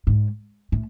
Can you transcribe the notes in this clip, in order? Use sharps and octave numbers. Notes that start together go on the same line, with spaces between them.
G#2
A2